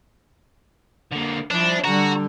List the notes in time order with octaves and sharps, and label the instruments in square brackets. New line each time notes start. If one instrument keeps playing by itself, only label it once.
[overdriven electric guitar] D3 A#3
[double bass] F3 [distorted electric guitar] D4 [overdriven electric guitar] E4 C5
[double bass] D3 G3 [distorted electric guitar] F#4 [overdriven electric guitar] A#5